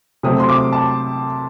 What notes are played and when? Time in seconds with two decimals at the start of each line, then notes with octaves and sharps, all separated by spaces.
0.23 C3 F#3 A3 C4 D#6
0.40 C6
0.49 D6
0.73 A5